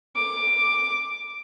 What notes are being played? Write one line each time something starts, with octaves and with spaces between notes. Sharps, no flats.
D6